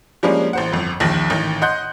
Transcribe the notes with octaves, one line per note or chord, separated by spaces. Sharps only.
F3 G3 G#3 A#3 C#4 D4
A1 C5 F#5
G1 F2
A#1 D#2 D#3 A#6 F#7
A1 D#3
D#5 F#5 C6 F#6 G6